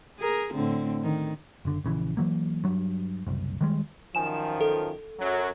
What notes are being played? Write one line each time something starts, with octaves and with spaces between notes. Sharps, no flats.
G#4 A#4
A2 D3 C4
D#3
F#1 D3
A#1 C#3 E3
E3 F#3 A#3
G2 F#3
F#1 C2
D#3 G3 G#3
F#2 D#3 F3 G#5 E7
A4
F#2 F#3